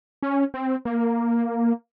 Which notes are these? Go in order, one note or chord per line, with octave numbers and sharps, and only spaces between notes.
C#4
C4
A#3